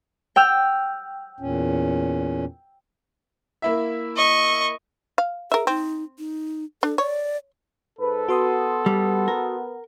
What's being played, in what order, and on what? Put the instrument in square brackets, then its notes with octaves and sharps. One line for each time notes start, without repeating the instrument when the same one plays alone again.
[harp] G5 E6 F6
[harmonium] E2 A#2 C#4
[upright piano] A#3 E4 E5
[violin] D#5 C#6
[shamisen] F5
[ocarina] G#4 [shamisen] A#4 E5
[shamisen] C4 [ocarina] D#4
[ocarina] D#4
[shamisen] D4 [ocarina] A4
[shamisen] C#5 [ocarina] D5
[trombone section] G#2 B4 [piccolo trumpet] A4
[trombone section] B3 [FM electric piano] F#4 C6 D#6
[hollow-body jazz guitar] G3
A#4